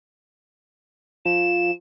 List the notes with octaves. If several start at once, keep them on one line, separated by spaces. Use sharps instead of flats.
F3 E7